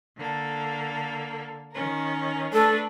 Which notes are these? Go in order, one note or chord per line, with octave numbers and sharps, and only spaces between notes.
D3 A#3 A4
D#3 C#4 A#4
A3 D4 A4 B4